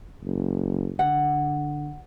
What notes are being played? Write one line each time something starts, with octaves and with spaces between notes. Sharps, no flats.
F#1
D3 F#5